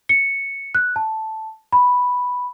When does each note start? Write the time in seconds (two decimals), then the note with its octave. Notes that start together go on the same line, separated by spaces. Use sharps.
0.09 C#7
0.75 F#6
0.96 A5
1.72 B5